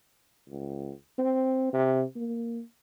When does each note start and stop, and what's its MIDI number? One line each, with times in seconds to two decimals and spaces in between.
0.49 0.92 37
1.18 1.70 60
1.73 2.04 48
2.16 2.62 58